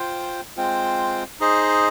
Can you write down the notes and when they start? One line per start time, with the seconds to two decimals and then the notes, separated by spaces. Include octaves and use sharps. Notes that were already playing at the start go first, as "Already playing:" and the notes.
Already playing: F4 C5 G5
0.57 G#3 C4 F4 C5 G5
1.40 D#4 G#4 C5 D#5